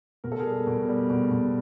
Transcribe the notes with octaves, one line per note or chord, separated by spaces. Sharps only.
B2 A#4
A4
G#4 A#4
G3
B2
G3
B2
B2